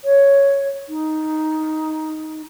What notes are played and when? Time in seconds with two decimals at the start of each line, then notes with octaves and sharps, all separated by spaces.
0.05 C#5
0.89 D#4